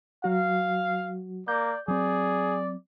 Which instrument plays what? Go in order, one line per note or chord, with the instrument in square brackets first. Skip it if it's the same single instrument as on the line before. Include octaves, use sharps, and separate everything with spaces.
[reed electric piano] F#3 F#4 [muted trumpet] F5
[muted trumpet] A#3 [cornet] D5 [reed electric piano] G6
[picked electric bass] F#3 C4 [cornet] G#4 [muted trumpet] D5